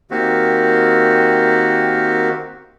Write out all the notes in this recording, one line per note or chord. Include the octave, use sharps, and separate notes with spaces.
D#3 A#3 C4 F#4 G4